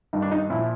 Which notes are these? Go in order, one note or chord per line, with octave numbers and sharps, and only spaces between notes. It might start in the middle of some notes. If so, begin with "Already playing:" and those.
G2 D#3 D#4
D4
D#4
A#2 F3 E4